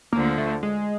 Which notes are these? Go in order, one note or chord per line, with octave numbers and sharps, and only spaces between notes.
D2 D3 F3 A#3
A3
G#3